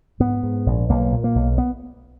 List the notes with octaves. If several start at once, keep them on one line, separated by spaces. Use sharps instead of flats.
G#2 B3
G#2
A#1
B1 A#3
A#2
A#3
B1
B3